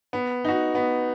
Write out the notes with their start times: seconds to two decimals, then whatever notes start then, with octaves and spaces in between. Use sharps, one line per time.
0.13 B3
0.45 D#4 F#4
0.75 B3